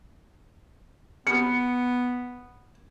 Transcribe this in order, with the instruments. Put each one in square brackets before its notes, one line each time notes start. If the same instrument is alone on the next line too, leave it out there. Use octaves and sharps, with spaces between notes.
[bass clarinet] B3 [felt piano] C#7